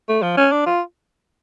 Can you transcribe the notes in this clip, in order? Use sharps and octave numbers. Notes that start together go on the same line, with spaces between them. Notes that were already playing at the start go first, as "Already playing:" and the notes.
A3
F3
C#4
D4
F4